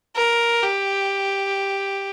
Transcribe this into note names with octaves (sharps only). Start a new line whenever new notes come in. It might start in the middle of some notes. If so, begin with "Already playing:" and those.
A#4
G4